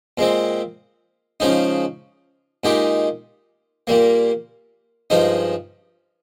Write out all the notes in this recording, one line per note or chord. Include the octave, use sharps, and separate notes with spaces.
A#2 G#3 C4
C#3 F3 G#3 D#4
A#2 G#3 D#4 G4
A#2 G3 A#3
G2 F3 G#3 D#4